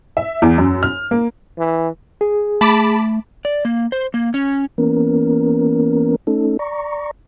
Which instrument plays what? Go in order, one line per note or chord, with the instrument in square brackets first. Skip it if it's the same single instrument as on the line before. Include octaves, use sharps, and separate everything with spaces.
[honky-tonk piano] E5
E2
F#2
F6
A#3
[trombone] E3
[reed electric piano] G#4
[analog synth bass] A3 [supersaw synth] A5 B5 D6
[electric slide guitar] D5
A#3
C5
A#3
C#4
[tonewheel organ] E3 A#3 B3 C#4 A#4
A3 C#4 D#4 A4
D5 A#5 C#6